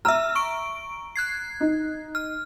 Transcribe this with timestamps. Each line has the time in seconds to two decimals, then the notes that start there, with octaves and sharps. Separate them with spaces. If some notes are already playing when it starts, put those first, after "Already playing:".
0.05 E5 A#5 E6 F6
0.35 C#6 D7
1.16 F#6 G#6 C7
1.61 D#4
2.15 F6